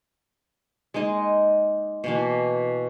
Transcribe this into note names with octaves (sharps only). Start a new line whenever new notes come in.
G#3 A#3 D#4 D#5
B2 E3 A#3